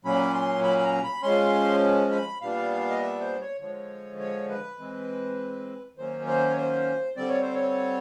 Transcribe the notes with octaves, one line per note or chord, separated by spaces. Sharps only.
A#2 F#3 A#3 C#4 B5
C6
B5
B5
A#5
B5
F3 G#3 C#4 C6
B5
A#2 G3 B3 D4 F5
D#5
E5
C5
C#5
D3 F3 G#3 C#5
C#5
B4
E3 G#3 C4
D#3 F#3 A#3 C#4 C5
C5
C#5
C5
D3 G3 C4 D5
C#5
C5
C#5